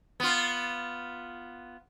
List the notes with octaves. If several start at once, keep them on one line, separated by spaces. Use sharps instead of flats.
B3 F4